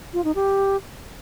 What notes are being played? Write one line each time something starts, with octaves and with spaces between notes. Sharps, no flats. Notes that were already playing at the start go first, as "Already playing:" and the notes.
F4
D#4
G4